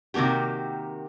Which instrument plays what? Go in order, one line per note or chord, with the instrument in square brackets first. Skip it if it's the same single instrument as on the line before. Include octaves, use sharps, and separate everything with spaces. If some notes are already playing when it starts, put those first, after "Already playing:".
[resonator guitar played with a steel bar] C3 D#3 A#3 F#4 G4